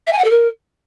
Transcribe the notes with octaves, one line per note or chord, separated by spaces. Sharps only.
E5
G#5
F#5
A4
A#4